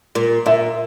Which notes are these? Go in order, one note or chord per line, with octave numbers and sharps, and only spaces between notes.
A#2
A#2 E5